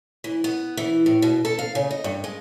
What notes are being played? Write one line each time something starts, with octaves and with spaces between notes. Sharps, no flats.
E3
B3
E3
A2
B2
A4
F5
C#3
D#5
G2
G#3